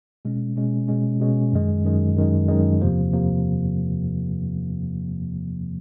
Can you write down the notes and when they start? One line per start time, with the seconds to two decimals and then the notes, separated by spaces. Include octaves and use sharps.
0.25 B2 G#3 C#4
0.56 B2 G#3 C#4
0.88 B2 G#3 C#4
1.20 B2 G#3 C#4
1.52 F#2 D#3 G#3
1.85 F#2 D#3 G#3
2.17 F#2 D#3 G#3
2.48 F#2 D#3 G#3
2.81 E2 C3 F3 A#3
3.13 C3 F3 A#3